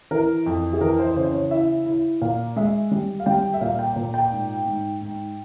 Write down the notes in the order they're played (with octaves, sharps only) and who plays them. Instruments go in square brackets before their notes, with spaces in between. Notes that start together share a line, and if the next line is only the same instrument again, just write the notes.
[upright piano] E3 A#4
F2
G#4
E3 A#4
C5
C#3 C5
C#5
E4 E5
E4
A#2 F5
G#3 E5
G3
F5
G3 G5
E5
A#2 F5
G5
A#2
G5
G#2
G#2
G#2